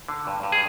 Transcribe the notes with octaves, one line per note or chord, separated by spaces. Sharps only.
D3
G2
G2
G#4